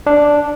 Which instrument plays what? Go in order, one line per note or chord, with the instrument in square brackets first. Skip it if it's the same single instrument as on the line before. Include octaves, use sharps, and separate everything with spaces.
[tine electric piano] D4